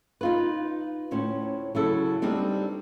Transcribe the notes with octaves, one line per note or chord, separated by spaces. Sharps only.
D#4 F4 B4
D2 A2 C#4 C5
C#3 F#3 E4 A4
G3 C4 D4 D#4 B4